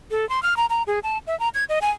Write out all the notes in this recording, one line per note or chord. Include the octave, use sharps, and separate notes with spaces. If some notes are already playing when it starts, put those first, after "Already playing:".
A4
C6
F6
A#5
A#5
G#4
A5
E5
A#5
G#6
D#5
G#5